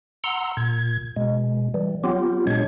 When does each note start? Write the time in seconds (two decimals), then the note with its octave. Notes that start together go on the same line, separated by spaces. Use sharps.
0.24 F#5 A#5 C6 E6
0.57 A#2 G#6
1.16 B2 G#3
1.74 E3 G3
2.04 F#3 B3 C4 F4 G4
2.47 A#2 G#3 D4 C#5 G#6